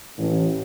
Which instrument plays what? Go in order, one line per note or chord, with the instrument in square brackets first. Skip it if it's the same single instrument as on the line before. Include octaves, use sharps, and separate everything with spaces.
[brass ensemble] A1